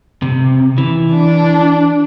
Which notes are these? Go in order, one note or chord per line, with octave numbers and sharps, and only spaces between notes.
C3
E3
D4